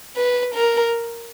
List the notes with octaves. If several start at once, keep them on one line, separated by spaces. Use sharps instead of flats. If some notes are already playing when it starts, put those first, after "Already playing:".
B4
A#4